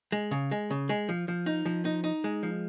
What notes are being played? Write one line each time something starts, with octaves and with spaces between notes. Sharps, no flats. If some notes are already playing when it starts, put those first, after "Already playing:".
G#3
C#3
G#3
C#3
G#3
F3
F3
D#4
F3
D#4
D#4
G#3
F3